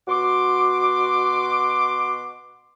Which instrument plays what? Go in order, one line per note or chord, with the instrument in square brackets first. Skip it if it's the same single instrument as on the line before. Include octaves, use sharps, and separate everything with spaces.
[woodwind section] B2 F#4 C6 D6